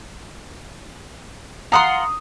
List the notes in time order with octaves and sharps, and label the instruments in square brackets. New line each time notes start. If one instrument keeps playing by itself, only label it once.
[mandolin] F4 F#5 C6 [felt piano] A#5 D#6